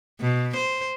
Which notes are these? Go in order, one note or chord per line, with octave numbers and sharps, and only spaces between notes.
B2
C5